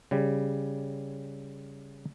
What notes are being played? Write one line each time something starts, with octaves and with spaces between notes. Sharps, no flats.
C#3 G3